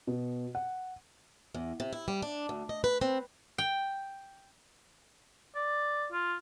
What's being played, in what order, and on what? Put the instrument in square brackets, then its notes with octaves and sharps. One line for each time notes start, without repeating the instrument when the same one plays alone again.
[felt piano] B2
F#5
[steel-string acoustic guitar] E2
C3
E4
G3
D4
D2
D#5
B4
C4
[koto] G5
[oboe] D5
F4